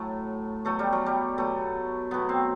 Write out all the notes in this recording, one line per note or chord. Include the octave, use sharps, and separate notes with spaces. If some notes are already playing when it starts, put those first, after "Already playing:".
Already playing: A2 F#3 A3
B2 F#3 A3
G3
F#3
G3
B2 F#3 A3
B2 F#3 B3
C4